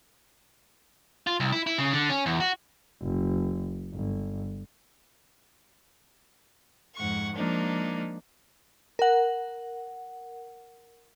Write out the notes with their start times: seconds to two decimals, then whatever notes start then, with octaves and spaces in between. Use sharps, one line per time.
1.27 F4
1.40 C2
1.52 E4
1.67 E4
1.78 C#3
1.93 D3
2.10 C#4
2.26 E2
2.40 F#4
3.02 F#1
3.94 G1
6.95 F2 G#2 F#5 C#6
7.34 F3 G#3 A#3 D4 D#4
8.99 A#4 F#5